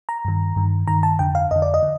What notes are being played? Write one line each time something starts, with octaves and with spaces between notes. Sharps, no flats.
A#5
G2 D#3
G2 D#3
G2 D#3 A#5
A5
F2 D3 G5
F5
F2 D3 D#5
D5
D#5
D3